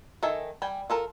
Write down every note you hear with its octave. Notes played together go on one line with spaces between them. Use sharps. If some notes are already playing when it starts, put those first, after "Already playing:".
D#3 A4 E5 G#5
G3 G5 G#5
F4 A4 A#4